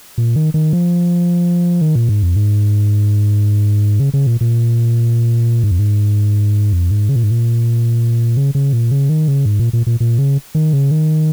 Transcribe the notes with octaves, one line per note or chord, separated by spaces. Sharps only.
A#2
D#3
D#3
F3
D#3
A#2
G#2
F2
G#2
C#3
C#3
A#2
A#2
G#2
F2
G#2
F2
G#2
C#3
A#2
G#2
A#2
C#3
C#3
A#2
C#3
D#3
C#3
G#2
A#2
A#2
A#2
A#2
C#3
D#3
C#3
D#3